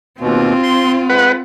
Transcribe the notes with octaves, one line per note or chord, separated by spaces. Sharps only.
D#2 B2 C4 F4
C6
G#3 B4 F#5